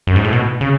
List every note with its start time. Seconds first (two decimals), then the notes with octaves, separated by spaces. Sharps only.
0.07 F#2
0.16 G#2
0.24 A2
0.33 B2
0.61 C#3